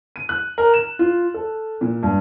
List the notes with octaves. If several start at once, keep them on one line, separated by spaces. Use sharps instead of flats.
D#7
F#6
A#4
E7
F4
A4
A#2
G2